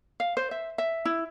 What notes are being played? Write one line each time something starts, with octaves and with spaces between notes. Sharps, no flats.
F5
C5
E5
E5
E4